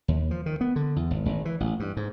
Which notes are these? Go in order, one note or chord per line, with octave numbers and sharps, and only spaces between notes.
D#2
F3
D#3
B3
D3
E2
G#1
G#1
E3
A1
G2
G#2